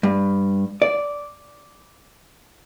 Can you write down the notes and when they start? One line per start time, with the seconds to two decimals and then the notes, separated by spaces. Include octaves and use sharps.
0.03 G2
0.82 D5